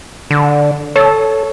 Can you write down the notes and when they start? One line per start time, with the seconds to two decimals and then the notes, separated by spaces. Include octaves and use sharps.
0.31 D3
0.96 A4 C#5